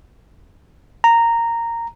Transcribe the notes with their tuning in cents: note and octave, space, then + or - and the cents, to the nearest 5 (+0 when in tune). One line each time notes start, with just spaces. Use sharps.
A#5 -10